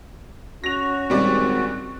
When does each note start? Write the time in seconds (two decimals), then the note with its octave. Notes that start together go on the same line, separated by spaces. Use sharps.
0.64 C#4 F#4 A#6 F7
1.10 G#1 A#2 G3 D5